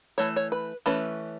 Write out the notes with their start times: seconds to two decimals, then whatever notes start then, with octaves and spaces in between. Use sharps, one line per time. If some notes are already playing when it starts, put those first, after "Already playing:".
0.18 E3 A3 C#5
0.36 C#5
0.52 B4
0.86 E3 A3 C#4 B4